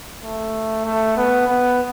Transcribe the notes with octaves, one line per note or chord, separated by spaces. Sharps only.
A3
A3
B3
B3